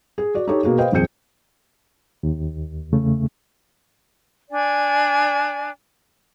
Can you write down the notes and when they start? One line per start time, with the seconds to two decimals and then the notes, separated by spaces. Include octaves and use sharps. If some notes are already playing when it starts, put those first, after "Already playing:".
0.18 G#4
0.35 F#4 D5
0.47 D#4 G4 A4 C#5
0.63 B2 A#3 F#4 G#4
0.78 B4 C5 D#5 F5 G5
0.92 D#1 F2 C4 G#4 G6 C#7
2.23 D#2
2.93 E2 C#3 A3
4.51 D4 D5 G#5